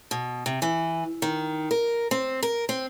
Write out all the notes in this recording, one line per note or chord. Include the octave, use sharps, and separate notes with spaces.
B2
C3
E3
D#3
A#4
C4
A#4
C4